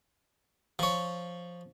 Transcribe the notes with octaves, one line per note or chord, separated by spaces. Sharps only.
F3 C#5